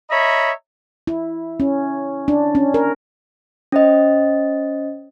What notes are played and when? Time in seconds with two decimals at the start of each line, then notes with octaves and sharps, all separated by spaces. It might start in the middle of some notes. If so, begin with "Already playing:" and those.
0.10 C#5 D#5 E5 A#5 B5
1.07 E4
1.60 C#4
2.28 D4
2.55 C#4
2.74 A#4
3.72 C#4 C5 D#5